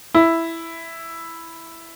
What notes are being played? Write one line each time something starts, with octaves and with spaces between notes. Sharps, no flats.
E4